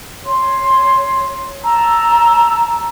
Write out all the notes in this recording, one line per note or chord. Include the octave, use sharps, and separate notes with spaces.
C#5 C6
A5 A#5 E6